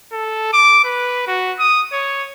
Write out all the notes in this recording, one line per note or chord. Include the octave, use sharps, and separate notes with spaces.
A4
D6
B4
F#4
D#6
C#5